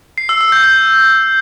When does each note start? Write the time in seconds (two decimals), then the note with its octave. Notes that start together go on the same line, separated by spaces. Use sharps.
0.18 C7
0.29 E6
0.41 E6
0.52 G6
0.64 G6